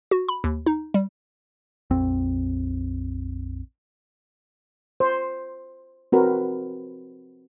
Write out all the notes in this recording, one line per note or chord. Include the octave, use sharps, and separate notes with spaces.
F#4
B5
D#2
D#4
G3
A#1 F2 C4
C5
C4 F#4 A#4 B4